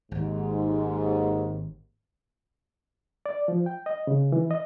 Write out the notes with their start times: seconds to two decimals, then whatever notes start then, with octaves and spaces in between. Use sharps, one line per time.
0.11 G#1 D#2 G#2
3.26 D5
3.48 F3
3.66 G5
3.86 D#5
4.07 C#3
4.32 E3
4.51 D#5